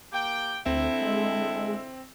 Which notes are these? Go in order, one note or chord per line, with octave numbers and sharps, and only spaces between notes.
A#3 G4 G5
D2 D3 C4 E4 A4
G#3